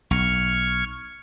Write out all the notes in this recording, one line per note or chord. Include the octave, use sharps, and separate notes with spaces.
B1 C#6 F6 G#6